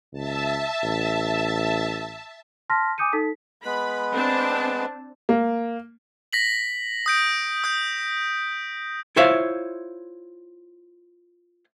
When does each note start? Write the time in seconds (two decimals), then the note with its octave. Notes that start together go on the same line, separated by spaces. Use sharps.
0.13 C#2 E5 A5
0.83 A1
2.70 A5 C6 F6 A#6 B6
2.98 G#5 D6 D#6 G6 C#7 D#7
3.13 D#4 A4 B6
3.65 G#3 B3 B4 B5
4.14 C4 D4 A5
5.29 A#3
6.33 A#6 B6 F#7
7.06 D#6 G6 D7
7.64 D#6 G6
9.16 E4 F4 C5 C#5 E5 F5